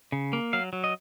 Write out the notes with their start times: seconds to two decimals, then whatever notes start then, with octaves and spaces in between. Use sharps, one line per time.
0.12 C#3
0.33 A#3
0.53 F#3 F5
0.73 F#3
0.84 D#5